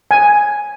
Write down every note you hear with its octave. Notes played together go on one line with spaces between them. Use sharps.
G#5